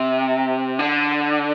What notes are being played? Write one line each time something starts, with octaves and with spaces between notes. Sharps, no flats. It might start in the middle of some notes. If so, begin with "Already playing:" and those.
Already playing: C3
D3